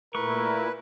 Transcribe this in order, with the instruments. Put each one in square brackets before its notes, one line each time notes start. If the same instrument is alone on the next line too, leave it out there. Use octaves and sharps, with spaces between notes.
[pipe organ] A#2 E4 [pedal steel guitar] A3 C#6 [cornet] A#4 [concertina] B4